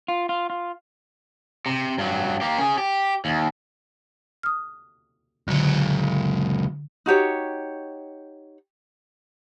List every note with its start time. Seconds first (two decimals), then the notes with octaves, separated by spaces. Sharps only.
0.08 F4
0.29 F4
0.50 F4
1.66 C3
1.98 G2 F#3
2.41 A#3 G4
2.58 C#4 G#4
2.78 G4
3.25 D#2
4.43 D#6 F6
5.48 C#2 D3 F#3
7.06 D#4 F#4 G4 C#5